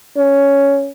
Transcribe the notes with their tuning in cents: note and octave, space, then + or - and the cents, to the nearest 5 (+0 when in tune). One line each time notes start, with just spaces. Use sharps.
C#4 +5